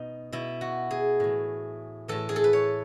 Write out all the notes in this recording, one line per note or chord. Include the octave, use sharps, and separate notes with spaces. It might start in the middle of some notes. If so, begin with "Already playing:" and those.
Already playing: B2 D#4
B2 E4
F#4
G#4
A2 E3
A2 E3 A4
G#4
A4
B4
C#5